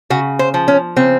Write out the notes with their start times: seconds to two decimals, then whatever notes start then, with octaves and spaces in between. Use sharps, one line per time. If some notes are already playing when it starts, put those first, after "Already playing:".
0.10 C#3 F#4
0.39 C5
0.54 F3
0.68 C#4
0.96 C#3 C4